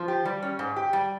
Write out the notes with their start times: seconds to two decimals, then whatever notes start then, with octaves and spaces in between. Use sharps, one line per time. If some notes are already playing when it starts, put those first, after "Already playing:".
Already playing: F3
0.08 G4
0.25 G3
0.43 C#4
0.59 G#2
0.76 G4
0.93 G3